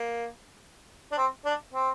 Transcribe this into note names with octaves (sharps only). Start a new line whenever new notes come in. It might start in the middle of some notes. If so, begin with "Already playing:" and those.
Already playing: A#3
D4
C4
D4
C4